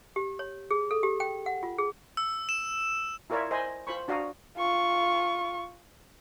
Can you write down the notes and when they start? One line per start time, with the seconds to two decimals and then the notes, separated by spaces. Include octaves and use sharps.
0.16 G4
0.39 C#5
0.71 G#4
0.91 A4
1.03 G4
1.20 G5
1.46 F#5
1.63 F4
1.78 G#4
2.17 E6
2.49 E7
3.30 E4 F4 A#4 C#5 D5 E5
3.51 C5 D#5 G#5 B5
3.87 F4 C5 B5 C#6
4.08 D4 F#4 D5 F5 A#5 D#6
4.57 F4 C#6